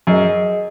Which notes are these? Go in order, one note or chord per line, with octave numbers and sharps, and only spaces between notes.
F#2 G#4 D#5 F#5